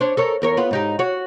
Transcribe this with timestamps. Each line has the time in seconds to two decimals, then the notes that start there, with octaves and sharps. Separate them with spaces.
0.01 D4 C5 C#5
0.17 A4 A#4 C#5
0.42 E2 A#4 C#5
0.57 B3 F4
0.71 G#2 D#4 G4
0.99 F#4 C#5